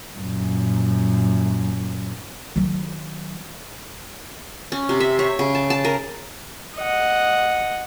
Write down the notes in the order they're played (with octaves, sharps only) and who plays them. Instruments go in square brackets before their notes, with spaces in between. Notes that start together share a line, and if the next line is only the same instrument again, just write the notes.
[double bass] F#2 A#2
[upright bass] D#3 F#3
[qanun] C#4
C3
E5
C#5
C#3
A5
A5
A#4
[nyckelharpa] D#5 F#5